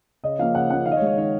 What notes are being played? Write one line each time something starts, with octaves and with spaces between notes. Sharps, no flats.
C#3 D#5
F3 A#3 F5
C#3 F#5
F3 A#3 F#5
D#3 F5
D#5
C#5
G#3
C#5
D#3 C#5